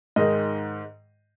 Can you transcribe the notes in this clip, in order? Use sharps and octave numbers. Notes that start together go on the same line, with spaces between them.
G#2 D#3 G#3 D#5